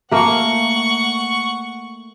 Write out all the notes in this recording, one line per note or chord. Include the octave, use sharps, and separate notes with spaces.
A3 A#3 A#4 F#5 C#6